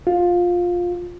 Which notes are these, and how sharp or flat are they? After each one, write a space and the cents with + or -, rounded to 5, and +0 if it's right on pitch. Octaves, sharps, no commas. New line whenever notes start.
F4 +15